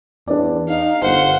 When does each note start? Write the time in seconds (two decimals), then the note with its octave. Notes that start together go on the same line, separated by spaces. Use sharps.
0.28 E2 D4 D5
0.69 D#4 F5
1.02 G1 C5 F5 F#5